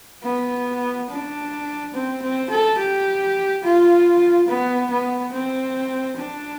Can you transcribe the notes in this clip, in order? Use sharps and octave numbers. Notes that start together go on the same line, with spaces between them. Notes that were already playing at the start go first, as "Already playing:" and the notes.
B3
D4
C4
C4
A4
G4
F4
B3
B3
C4
D4